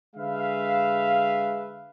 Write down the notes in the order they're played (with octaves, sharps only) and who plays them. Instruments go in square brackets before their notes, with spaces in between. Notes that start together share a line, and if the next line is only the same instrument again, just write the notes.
[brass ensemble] D3 G#3 B4 E5 F5